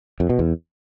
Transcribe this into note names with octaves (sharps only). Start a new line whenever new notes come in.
F2
B2
E2